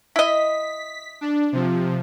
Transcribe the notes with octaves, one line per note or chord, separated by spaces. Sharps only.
E4 D#5 B6
D4
C3 F3